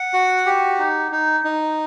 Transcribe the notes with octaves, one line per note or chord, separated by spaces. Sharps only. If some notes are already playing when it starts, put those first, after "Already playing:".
Already playing: F#5
F#4
G4
D#4
D#4
D#4